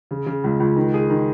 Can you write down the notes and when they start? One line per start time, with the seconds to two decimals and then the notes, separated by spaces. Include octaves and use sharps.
0.11 C#3
0.26 C#3
0.44 C#2
0.60 C#2
0.76 D#3
0.94 G#4
1.10 D#3